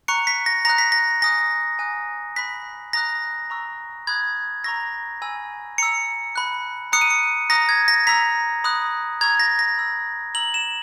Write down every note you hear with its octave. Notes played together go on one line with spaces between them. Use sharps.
A#5 C#6 F#6 C#7
B6
A#6
A#5 D#6 F#6 A#6
B6
A#6
G#5 D#6 F#6 A#6
G#5 D#6 F#6
B5 F#6 B6
A#5 D#6 F#6 A#6
A#5 C#6 E6
B5 D#6 F#6 G#6
A#5 C#6 E6 A#6
G#5 B5 E6
A#5 E6 C#7
B5 F#6
A#5 D#6 F#6 C#7
D#7
C#7
A#5 D#6 F#6 A#6
G#6
A#6
A#5 E6 B6
B5 D#6 F#6
A#5 C#6 E6 G#6
A#6
A#6
B5 E6
A#5 E6 F#7
E7